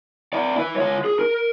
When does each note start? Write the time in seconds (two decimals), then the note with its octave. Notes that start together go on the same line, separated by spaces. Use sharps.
0.33 E4 D5
0.56 E4 B4
0.76 F4 C#5
1.04 G#4
1.19 A#4